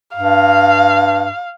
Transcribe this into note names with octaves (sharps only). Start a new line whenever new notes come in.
G2 F5